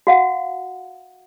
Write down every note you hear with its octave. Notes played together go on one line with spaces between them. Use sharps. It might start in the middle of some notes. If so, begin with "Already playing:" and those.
F#4 F5 F#5